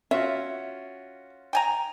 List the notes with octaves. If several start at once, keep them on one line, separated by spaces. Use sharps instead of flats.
C#4 F4 F#4 E5
G5 G#5 A#5